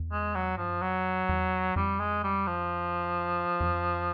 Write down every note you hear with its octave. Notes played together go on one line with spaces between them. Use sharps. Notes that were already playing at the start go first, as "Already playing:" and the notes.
Already playing: E2
G#3
F#3
G2 F3
F#2
F2 F#3
E2
F2 G3
G#3
G3
F3
E2
F2